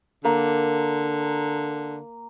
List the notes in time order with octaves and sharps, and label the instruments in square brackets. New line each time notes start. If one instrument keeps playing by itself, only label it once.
[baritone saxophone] D3 [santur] A#3